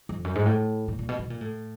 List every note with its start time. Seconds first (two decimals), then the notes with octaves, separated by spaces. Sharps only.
0.09 F2
0.24 F#2
0.35 G#2
0.46 A2
0.88 A#2
0.99 A#2
1.09 B2
1.19 B2
1.30 A#2
1.41 A2